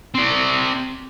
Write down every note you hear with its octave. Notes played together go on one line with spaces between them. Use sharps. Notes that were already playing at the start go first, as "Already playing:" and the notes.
C4 D5